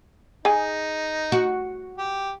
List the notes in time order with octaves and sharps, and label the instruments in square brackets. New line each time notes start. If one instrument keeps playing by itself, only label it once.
[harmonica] D#4 [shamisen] G#4 G#5
[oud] F#4
[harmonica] G4